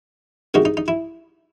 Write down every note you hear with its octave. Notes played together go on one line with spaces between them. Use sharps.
C3 D#3 G#3 D#4 F#4
D#4
D#4
E4